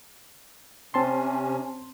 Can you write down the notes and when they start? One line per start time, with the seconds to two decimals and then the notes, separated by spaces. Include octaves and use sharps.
0.94 C3 C4 C#4 A5 C6